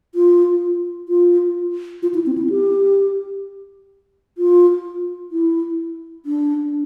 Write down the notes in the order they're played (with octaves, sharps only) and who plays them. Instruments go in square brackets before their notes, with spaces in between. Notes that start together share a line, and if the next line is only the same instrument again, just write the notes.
[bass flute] F4
F4
F4
E4
C4
E4
G4
F4
E4
D4